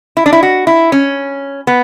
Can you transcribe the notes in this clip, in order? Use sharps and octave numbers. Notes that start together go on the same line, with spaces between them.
E4
D4
E4
F#4
E4
C#4
B3